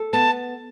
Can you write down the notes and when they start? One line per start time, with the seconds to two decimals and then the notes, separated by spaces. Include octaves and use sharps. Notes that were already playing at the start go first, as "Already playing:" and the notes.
Already playing: A4
0.13 B3 A5